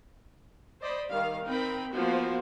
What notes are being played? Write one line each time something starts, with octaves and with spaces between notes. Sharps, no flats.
C5 D5 D#5 B5
D#3 G3 F5
C4 D#4 A#4 G5 B5
F3 A#3 B3 F4 F#4 C5